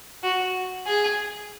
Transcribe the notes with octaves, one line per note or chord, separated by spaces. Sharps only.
F#4
G#4